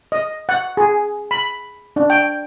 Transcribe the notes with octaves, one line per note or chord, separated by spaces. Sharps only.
D#5
F#5
G#4
B5
D4
G5